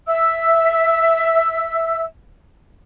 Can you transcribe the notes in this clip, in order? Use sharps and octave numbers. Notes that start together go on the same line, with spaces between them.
E5 E6